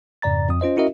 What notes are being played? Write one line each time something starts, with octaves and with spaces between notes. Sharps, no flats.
F2 G#2 C#3 D5 A#5 A6
F2 D#6
C#4 F4 C5 D#5
C#4 E4 F#4 A#4 D#5 E5